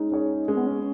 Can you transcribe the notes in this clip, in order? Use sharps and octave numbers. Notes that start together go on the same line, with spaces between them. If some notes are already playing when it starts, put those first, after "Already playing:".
Already playing: G#3 C#4 D#4
C#4 G#4 C#5
G#3 C#4
B3
C#4